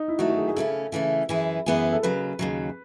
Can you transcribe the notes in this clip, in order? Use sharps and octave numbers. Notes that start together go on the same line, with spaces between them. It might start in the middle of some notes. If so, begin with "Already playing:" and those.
Already playing: D#4
E4
D#3 F#3 A3 F#4
F#4
G#4
G#4
C#3 E3 A3 C#4 A4
C#3 E3 A3 C#4
F#2 E3 B3 E4 G#4
F#2 E3 B3 E4 G#4
A4
D#2 C#3 F#3 B4
D#2 C#3 F#3